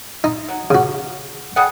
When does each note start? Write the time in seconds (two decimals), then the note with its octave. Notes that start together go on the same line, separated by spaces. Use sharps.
0.24 D#4
0.49 F#3
0.70 C#3 F#4
1.56 G3 G#4 F#5